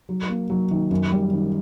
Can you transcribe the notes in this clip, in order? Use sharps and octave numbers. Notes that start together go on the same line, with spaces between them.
F#3
A#3
F#3
D#3
F#2
G3
D#3